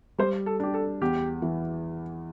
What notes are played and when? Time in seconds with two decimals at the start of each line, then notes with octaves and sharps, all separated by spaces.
0.18 G3 C5
0.46 A4
0.60 D4 G4
0.74 A4
1.01 E2 G4
1.42 E3